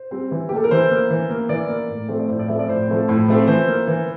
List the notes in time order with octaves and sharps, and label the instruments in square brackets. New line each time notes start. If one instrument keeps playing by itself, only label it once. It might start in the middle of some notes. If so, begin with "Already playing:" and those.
Already playing: [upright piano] C5
G3 C4
E3
G4
A#3 A4
A#4
E3 C5
A#3
E3
A#3
E3 D5
A#3
A2
F3 A3 C4
D5
A2 C5
D5
F3 A3 C4 E5
D5
A2 C5
F3 A3 C4
A2
F3 A3 C4
E3 C5
A#3
E3